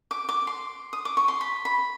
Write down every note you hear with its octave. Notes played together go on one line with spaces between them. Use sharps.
D6
D6
C6
D#6
D6
C#6
C6
B5
B5